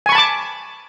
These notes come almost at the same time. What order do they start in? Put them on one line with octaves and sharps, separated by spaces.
G#5 C#6 B5 A5 D6